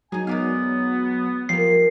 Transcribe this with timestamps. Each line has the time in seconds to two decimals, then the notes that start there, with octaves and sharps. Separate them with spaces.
0.12 F#3 D#4 G#4 G#5
0.27 G#3 B3 D5 F5
1.49 F3 G3 A#3 C7